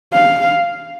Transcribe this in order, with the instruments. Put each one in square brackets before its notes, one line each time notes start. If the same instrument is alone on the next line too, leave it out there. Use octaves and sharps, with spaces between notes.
[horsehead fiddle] F5